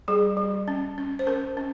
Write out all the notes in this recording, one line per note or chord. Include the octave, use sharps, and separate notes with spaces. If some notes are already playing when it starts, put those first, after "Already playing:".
G3 G#4
G3
C#4
C#4
C5
C#4 A#4
C#4